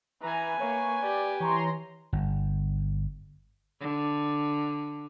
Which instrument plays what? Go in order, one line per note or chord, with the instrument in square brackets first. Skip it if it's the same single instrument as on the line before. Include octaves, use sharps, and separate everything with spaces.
[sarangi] E3 [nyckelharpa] B4 G#5 [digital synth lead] A#5
[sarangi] A#3 [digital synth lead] C#5
[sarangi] G4 [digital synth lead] D5
[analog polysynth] E3 A#5 C6 [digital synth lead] C#5
[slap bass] G1
[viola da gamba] D3